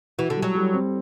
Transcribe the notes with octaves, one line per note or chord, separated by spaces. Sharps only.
E3 F#4
D3
G3
F#3
G3
C4